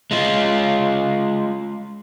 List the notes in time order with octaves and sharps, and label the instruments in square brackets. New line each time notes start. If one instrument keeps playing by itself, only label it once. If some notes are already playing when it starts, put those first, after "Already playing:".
[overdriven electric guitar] G#3 F4